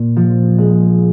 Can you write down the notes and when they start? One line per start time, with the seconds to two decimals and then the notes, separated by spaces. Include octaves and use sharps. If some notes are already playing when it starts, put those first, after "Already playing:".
Already playing: A#2
0.16 F3
0.58 G#3